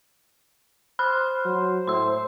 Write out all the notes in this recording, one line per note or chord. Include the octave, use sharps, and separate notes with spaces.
C5 B5 F6 F#6
F#3
A2 C6 E6